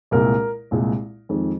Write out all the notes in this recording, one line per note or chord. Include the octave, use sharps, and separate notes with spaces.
C2 A#2 G#3 A#4
C2 A#2 G#3
F2 D#3 G#3